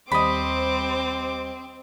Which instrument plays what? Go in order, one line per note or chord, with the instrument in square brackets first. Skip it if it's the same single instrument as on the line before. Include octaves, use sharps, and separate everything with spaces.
[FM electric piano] D#2 G3 [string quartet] C4 [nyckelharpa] C5 D6 [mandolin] D#5 B5